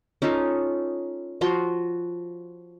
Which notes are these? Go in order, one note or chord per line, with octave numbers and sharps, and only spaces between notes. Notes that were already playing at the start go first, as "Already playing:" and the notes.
C#4 D#4 F4 A4
F3 F4 F#4 C6